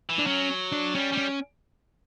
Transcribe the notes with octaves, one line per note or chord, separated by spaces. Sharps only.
E3
D4
F#3 C#4
D4
G3 C#4
G3
C#4